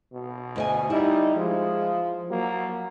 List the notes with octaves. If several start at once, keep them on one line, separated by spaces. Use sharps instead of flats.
B2
D2 D#5 G#5
G3 D#4 E4
F3 G#3
F#3 A#3